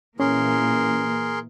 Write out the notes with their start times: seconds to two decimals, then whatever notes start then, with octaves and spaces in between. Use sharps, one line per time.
0.20 A#2 E3 A#3 C#4 G#4 A#4 C6